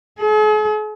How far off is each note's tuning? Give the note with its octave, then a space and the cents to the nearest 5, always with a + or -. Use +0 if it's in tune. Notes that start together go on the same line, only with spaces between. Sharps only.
G#4 +45